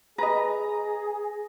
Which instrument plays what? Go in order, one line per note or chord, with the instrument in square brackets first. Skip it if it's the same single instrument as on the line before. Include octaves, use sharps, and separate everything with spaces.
[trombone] G#4 [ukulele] B4 D#5 [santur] A#5